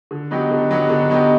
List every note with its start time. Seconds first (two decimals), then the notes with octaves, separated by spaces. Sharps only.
0.11 D3
0.31 F#3 B3 D#4 G4
0.51 D3
0.70 F#3 B3 D#4 G4
0.90 D3
1.10 F#3 B3 D#4 G4